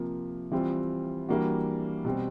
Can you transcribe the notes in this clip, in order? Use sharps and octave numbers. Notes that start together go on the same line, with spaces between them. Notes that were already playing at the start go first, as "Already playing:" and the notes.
Already playing: C3 F3 A#3
E3 G3 C4 F4
E3 G3 A#3 D4 F#4
B2 G3 C4